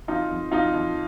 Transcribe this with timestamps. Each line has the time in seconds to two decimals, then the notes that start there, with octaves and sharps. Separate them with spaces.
0.08 F2 D#4 F4
0.30 F2
0.51 F2 D#4 F4
0.74 F2